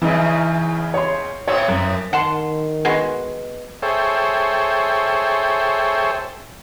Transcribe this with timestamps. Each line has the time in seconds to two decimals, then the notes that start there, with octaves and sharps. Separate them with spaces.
0.02 E2 C#3 E3 D#4
0.94 C#5 C6
1.48 A2 B3 C4 C#5
1.68 F#2
2.13 D#3 F#5 A5 C6
2.85 G#3 B3 F#4
3.82 G#4 A4 C5 C#5 E5 G5